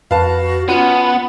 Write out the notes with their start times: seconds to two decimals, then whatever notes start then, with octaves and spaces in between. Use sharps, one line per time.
0.11 F2 F#4 B4 F5 A5
0.69 B3 C#4 F4